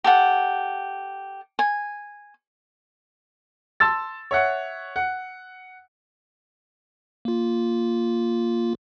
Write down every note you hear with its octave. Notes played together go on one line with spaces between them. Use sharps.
G4 A4 F#5
G#5
A5 C6 E6 A6
C#5 E5 F#5
F#5
A#3 F4